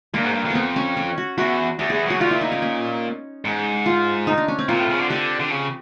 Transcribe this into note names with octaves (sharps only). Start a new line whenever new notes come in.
G2 A#3
G#2
G2
F2
B3
C4
C#4
C#4
F#4
E2 F#4
E2 G4
E2 G#4
F#2 F#4
A#2 F4
E4
D#4
C#4
C#4
G#2
F4
D#4
D4
C#4
C4
A#2 F4
A2
C#3
D3
D3 G4
D3
C#3